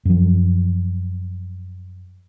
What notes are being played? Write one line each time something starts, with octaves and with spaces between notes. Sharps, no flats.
F#2 F3